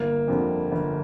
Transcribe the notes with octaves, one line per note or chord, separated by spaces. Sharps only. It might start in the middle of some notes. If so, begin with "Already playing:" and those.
Already playing: G1 A#3
F2 D3 G3
G1